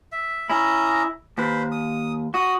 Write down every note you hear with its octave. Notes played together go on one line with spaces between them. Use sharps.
E5
C#4 E4 D#5 A#5
D#2 B4 C5
D#6
F#4 D#5 D#6